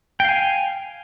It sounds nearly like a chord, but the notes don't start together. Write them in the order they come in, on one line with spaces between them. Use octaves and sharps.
G5 F5 G#5